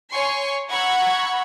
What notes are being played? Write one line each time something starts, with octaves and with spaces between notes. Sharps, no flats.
C#5 G#5 C6 C#6
F#5 A#5 B5 C#6 E6 G#6